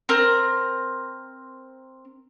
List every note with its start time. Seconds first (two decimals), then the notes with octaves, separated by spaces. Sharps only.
0.09 C4 A#4